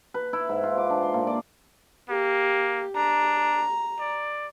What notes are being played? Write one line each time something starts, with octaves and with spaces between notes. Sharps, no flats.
B4
E4
G#2
F4
D6
D4
C6
A#2
D5
A#3 G4
D4 A#5
D5